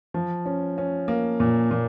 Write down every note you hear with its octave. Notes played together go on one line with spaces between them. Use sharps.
F3
C#4
C#4
A#3
A#2
A#2